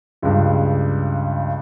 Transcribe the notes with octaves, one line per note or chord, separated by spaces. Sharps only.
C#2 G2